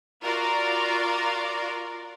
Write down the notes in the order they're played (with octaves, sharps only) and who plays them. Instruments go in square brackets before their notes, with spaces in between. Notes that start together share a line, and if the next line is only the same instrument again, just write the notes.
[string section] F4 F#4 A#4 D5